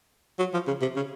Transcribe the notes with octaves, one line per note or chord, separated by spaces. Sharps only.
F#3
F3
C#3
C3
C#3